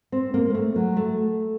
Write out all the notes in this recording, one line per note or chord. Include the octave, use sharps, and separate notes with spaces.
C4
A#3
A#3
A3
F#3
A3